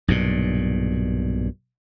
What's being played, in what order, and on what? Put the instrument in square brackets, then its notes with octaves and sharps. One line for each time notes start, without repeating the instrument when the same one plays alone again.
[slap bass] B1 G2 A#2